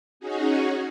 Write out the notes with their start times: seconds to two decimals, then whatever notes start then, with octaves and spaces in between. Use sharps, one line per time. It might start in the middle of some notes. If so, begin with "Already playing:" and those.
0.20 C#4 D#4 F#4 G#4